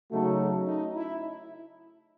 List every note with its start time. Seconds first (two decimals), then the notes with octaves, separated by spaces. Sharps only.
0.12 C#3 F#3 A3 D#4 F#4 A4
0.68 D#4
0.95 E4